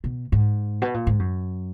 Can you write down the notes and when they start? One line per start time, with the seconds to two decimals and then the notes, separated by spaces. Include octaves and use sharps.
0.04 B2
0.32 G#2
0.82 B2
0.94 A#2
1.07 G#2
1.19 F#2